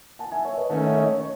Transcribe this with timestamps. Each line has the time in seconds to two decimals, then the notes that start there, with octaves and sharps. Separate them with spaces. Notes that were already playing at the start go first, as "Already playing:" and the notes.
0.19 F#5 A5
0.31 E5 G#5
0.45 C#5 E5
0.57 B4 D#5
0.70 D#3 A3 C#4 F#5 A5
0.86 C#5 E5
0.98 D#5
1.03 C#5
1.21 C#5